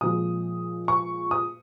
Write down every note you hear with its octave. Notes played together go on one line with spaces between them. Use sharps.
A#2 F3 G#3 D#6
C#6
D#6